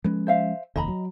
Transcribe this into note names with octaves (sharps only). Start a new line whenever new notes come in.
F3 G#3 C#4 B4
C5 E5 F5
F1 D#2 D#5 A#5 B5
F#3